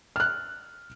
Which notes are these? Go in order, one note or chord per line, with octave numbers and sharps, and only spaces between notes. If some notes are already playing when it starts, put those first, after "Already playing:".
F6 F#6